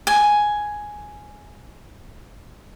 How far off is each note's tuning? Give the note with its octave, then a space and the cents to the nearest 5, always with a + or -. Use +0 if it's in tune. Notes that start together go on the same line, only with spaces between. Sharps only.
G#5 +5